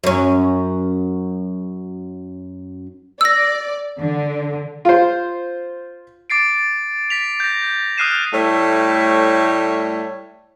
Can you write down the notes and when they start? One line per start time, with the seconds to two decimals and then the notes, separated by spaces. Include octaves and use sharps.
0.04 F#2 C#4
3.21 D5 E6 A#6
4.00 D3
4.85 F4 C5
6.30 D6 A6 C7 D7
7.10 A6 B6 F7
7.40 G6 A#6
7.98 D#6 F6 F#6 C7 D#7 E7
8.34 A2 G3 A3 C#5